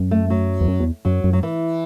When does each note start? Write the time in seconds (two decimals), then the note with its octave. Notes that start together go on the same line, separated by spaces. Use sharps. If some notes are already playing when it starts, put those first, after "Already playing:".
Already playing: F#2
0.11 A3
0.30 F#3
0.61 E2
0.68 F#2
0.80 E2
1.05 F#2 F#3
1.24 F#2
1.33 F#3
1.43 E3